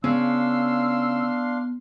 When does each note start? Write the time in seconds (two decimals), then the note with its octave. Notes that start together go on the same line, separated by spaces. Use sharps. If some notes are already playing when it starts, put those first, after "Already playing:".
0.04 C#3 B3 D4 F5 C6 E6